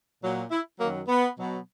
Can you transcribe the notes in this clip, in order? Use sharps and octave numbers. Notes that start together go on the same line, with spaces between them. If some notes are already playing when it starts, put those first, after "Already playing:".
A#2 F#3
E4
F#2 D#3 F#3 A#3
B3
B2 F#3